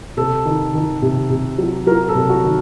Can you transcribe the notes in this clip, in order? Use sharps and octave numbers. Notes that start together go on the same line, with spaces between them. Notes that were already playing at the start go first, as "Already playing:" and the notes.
C3 A4
D#3
D#3
C3
C3
F#3
F#3 A#4
A4
C3
F#4
D#3